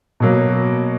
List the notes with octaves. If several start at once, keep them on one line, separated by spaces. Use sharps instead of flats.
B2 F#3 A#3